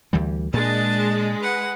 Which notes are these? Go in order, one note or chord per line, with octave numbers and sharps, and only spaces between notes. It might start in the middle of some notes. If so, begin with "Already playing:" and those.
D2 E3 G3
A#2 G#3 D4 A5
B4 F#5